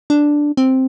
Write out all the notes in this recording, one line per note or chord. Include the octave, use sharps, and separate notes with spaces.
D4
C4